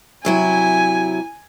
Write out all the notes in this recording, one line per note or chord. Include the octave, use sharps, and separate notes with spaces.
C3 F#3 E4 G#5